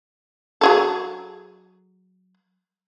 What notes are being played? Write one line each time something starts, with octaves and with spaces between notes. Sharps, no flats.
F#3 G#4 A4